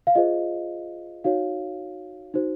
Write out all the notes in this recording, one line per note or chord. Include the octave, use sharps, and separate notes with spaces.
F5
F4 G#4 C5 D#5
D#4 F#4 C#5 F5
D#4 F#4 C5